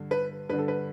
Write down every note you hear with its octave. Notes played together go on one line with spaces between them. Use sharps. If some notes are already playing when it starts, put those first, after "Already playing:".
Already playing: G2 D3
B4
G2 D3 B4
A4
B4